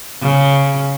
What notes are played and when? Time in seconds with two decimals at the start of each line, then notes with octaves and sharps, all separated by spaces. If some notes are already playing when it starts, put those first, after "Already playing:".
0.22 C#3